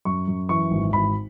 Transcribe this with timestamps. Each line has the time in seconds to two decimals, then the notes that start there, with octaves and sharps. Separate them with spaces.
0.05 F#2 C#6
0.27 F#2
0.49 E3 C#6
0.71 G#1
0.93 G#1 B5